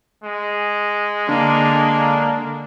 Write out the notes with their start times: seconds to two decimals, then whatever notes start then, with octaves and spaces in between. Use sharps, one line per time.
0.24 G#3
1.29 D3 A#3 D4